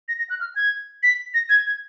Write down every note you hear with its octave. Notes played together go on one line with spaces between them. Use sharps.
A#6
A#6
F#6
F6
G#6
B6
A#6
G#6
G#6